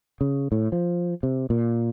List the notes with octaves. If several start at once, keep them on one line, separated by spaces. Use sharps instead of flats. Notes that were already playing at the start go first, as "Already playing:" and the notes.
C#3
A2
F3
C3
A#2